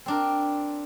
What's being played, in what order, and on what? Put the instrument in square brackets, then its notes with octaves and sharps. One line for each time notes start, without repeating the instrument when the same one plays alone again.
[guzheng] C4 D4 A#4